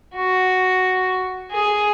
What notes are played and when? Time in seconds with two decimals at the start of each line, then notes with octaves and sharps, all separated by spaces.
0.15 F#4
1.50 G#4